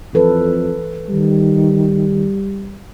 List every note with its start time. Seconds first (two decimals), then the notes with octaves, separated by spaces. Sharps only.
0.14 F2 E3 A4 B4
1.09 D#3 G3